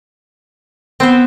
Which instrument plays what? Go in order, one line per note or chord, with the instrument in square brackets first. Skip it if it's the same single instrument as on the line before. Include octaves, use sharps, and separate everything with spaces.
[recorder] B3 [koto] C4 C5